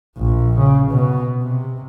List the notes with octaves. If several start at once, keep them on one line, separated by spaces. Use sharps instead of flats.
A#1
C#3
B2
C3